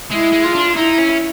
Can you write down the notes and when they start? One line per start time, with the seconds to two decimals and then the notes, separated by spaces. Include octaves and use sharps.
0.11 G#3 E4
0.33 G#3
0.44 F4
0.55 D4
0.76 D#4 E4
0.98 C#4